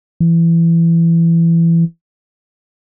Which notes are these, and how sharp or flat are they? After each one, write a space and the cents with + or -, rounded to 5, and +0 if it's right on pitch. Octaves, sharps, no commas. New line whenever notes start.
E3 +20